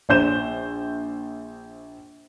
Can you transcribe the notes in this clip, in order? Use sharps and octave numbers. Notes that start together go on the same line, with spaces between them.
A#1 C5 G6 E7